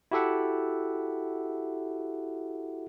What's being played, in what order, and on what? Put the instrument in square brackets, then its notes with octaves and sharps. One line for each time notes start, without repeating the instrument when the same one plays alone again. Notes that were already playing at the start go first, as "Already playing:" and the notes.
[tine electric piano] E4 F#4 G4 A4 E5 F#5